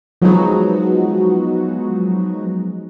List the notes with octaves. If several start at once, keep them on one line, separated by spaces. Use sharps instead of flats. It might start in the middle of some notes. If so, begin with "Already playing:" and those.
F3 F#3 G#3 B3 D#4 F#4